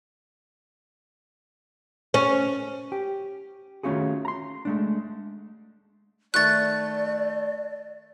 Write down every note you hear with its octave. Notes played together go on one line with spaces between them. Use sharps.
C#4
G4
D#3 A3 C#4 F4 F#4 G#4
A#5 C6
G#3 A3 D4
D#3 A3 D5 C#6 F#6 A6